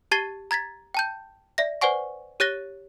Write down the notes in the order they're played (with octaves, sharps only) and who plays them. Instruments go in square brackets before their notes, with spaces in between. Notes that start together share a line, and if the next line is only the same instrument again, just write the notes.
[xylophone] G4 A5 G#6 A6 C7 G7
A#5 G#6 A6 B6
G5 A5 G6
D5 E5 A#6
B4 C5 D5 F#5 G#5 C#6
G4 C#5 F#6 A6 A#6 G7